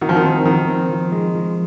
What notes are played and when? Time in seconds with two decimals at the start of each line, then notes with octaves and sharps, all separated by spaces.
0.01 D#3 F#4
0.09 F3
0.16 D#3
0.24 C4
0.45 D#3 F3
0.68 C4
0.90 F3
1.12 G#3
1.35 F3